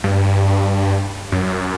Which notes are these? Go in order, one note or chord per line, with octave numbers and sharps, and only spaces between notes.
G2
F#2